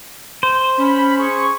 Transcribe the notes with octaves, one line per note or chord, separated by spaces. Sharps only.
C5
C#4 B5
G#4 C#6